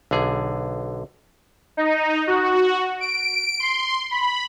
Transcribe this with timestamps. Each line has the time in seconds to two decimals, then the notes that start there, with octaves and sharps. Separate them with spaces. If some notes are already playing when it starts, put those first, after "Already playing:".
0.11 B1 D3 G#4
1.77 D#4
2.27 F#4
3.01 D7
3.60 C6
4.11 B5